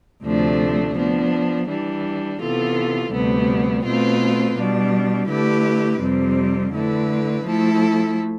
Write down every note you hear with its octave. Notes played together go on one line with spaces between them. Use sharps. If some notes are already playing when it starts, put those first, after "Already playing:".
D2 C3 F3 A3 D4
F3 B3 D4
E3 G3 D4
C3 E3 B3 F4 A4
D2 C3 G3 B3
B2 A3 C4 F4 B4
B2 G3 D4
D3 A3 E4 G4 B4
F2 C3 G3 C4
D3 A3 E4 B4
F3 A3 E4 A4